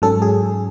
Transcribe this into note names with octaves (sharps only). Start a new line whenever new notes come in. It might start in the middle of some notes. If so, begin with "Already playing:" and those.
G#2 F#3 C#4 A4
G#4